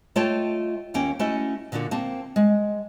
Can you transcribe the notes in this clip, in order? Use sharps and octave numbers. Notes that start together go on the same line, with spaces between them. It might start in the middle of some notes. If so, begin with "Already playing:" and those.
A3 F4 C#5 D#5 G5 A5
D#2 A#3 C#4 G5
A3 C#4 E4 F#4 D#5
A#2 D3 A#3 D4 F#4
A#3 C4 A5
G#3